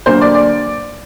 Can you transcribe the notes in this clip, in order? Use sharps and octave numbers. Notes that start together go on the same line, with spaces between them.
D2 D3 F#3 A#3 C5
D5
D5